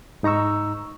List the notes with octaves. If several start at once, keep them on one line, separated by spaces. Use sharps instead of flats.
G#2 D#4 A#5 C#6 E6